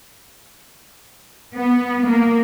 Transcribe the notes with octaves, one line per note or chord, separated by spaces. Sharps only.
B3
A#3